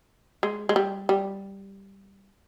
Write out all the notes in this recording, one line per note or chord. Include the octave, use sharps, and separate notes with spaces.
G#3
G#3
G3
G3